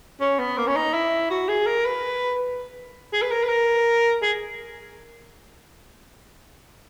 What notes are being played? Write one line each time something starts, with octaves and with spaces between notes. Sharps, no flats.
C#4
B3
A#3
C#4
D#4
E4
F#4
G#4
A#4
B4
G#4
B4
A#4
B4
A#4
G#4